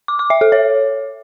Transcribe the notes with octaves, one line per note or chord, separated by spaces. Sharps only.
D6
D6
E5
A4
C#5